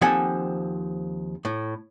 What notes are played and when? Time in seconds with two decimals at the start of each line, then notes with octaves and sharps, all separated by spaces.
0.01 D#2 F3 C4 A4 F#5 G#5
1.45 A2